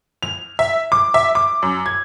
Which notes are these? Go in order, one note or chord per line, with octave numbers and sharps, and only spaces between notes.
F7
E5
D6
E5
D6
F#2
G#6